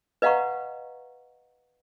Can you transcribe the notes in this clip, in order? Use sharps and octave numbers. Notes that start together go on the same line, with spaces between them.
B4 D#5 F5 F#5 A#5 C#6